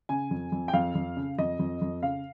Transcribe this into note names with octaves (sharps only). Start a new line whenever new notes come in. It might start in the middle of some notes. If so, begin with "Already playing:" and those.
C#3 G#5
F2
F2
G5
F2 F5
F2
C#3
F2 D#5
F2
F2
C#3 F5